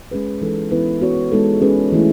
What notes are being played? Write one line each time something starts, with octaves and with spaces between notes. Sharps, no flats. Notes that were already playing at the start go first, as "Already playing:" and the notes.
G#3 C#4 G#4 B4
E3 G#3 D#4 A4
E3 B3 E4 B4
B3 F#4 C#5
G#3 B3 D#4 A4
G#3 C#4 G#4 B4
E3 A3 E4